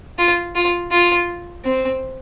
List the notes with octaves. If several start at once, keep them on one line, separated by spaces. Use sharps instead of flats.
F4
F4
F4
C4